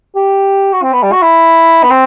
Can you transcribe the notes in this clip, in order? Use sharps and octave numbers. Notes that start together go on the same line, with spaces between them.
G4
F#4
C4
B3
G3
F#4
E4
B3
C4